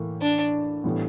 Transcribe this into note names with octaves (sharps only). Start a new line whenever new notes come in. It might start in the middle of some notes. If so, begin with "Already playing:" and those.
Already playing: A2 E3 A#3
D4
A2 E3 G3 B3